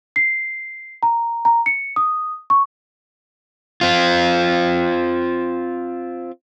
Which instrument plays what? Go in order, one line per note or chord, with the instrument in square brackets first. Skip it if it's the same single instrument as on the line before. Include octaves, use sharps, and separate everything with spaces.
[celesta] C7
A#5
A#5
C#7
D#6
C#6
[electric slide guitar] C4 F4